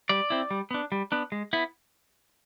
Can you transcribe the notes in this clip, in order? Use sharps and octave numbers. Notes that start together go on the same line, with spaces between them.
G3 D5
C4 E4
G3
B3 D4
G3
B3 D4
G#3
B3 E4